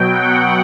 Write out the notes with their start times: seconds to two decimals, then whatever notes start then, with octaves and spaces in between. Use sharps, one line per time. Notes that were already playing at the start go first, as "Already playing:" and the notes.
Already playing: B2 F#3 G5
0.12 F#5